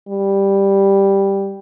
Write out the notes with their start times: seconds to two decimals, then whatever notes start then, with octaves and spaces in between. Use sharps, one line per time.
0.08 G3